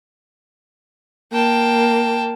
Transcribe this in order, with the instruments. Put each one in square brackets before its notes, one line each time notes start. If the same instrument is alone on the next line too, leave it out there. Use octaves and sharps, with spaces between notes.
[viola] A#3 [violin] G5 A5